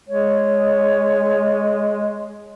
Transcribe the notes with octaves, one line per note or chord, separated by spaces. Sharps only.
G#3 C#5